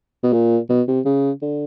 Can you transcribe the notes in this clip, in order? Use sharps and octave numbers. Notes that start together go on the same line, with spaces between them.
B2
A#2
B2
C3
C#3
D3